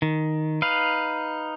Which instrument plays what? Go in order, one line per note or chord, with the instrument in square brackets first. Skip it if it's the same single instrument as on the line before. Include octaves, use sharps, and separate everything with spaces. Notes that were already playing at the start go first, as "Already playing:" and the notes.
[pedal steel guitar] D#3
D#4 B4 F5